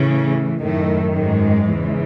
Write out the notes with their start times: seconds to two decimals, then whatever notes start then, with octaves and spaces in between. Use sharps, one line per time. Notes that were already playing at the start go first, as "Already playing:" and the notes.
Already playing: A2 C#3 E3 C#4
0.62 F#2 A2 D#3 A3
1.15 G#2 G#3
1.68 E2 C#3 E3